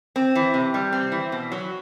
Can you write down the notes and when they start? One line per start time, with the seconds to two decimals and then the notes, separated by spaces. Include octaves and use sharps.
0.16 C4
0.35 E3
0.54 C3
0.74 G3
0.92 C4
1.12 E3
1.32 B2
1.52 F#3